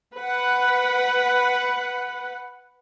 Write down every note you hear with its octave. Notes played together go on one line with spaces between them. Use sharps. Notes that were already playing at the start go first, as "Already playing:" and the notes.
B4 F#5